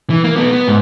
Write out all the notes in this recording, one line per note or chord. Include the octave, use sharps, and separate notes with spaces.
E3
A#3
F#3 B3
B3
G#2